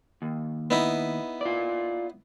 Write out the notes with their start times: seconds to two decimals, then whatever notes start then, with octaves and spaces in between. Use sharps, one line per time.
0.22 D#2
0.70 B3 D#4 E4
1.41 F4 D5